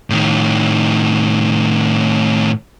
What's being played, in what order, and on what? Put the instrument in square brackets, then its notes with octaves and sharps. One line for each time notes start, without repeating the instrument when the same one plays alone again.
[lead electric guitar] A2 D#3